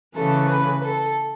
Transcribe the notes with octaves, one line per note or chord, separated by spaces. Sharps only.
C#3 E3 A3 A4
B4
A4